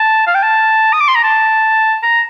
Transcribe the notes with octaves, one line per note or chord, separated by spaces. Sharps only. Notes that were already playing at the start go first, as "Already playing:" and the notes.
Already playing: A5
F5
G5
A5
D#6
D6
C6
A#5
A5
A#5